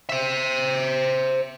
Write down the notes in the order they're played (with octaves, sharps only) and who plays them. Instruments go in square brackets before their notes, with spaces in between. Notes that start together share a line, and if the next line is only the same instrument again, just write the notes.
[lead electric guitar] C5 E5